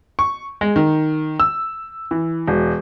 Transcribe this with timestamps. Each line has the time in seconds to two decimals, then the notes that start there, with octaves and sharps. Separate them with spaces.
0.19 C#6
0.61 G#3
0.76 D#3
1.40 E6
2.11 E3
2.47 E1